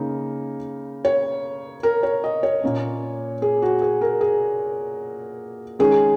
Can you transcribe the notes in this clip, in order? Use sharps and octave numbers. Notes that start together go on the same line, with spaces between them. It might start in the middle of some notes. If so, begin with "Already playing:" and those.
Already playing: C#3 A#3 D#4
C#5
A#4
C#5
D#5
C#5
A#2 A#3 C#4
G#4
F#4
G#4
A#4
G#4
D#3 G#3 C#4 G#4